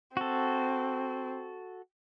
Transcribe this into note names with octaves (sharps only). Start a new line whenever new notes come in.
C4 F#4 A4